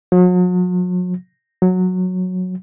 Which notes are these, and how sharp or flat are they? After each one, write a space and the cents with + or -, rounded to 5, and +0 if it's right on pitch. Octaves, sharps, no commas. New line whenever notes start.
F#3 -40
F#3 -10